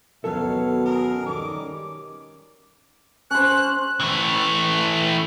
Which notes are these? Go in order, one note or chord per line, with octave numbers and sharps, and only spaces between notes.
D#2 B2 F#3 C#4 A4 F5
G#4 A#4
D#3 G3 C#4 D6
C#4 C5 F#6
E3 A3